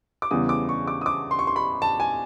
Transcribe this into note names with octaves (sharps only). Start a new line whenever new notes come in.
D6
E2 C#3 E3 G3 D#6
D6
C#6
D6
D#6
D6
C6
C#6
C6
B5
A5
G#5